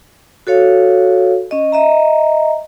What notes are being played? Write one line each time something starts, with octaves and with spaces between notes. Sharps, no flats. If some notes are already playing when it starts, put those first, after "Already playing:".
F#4 A4 C#5 F5
C#4 D#5
D#5 E5 A#5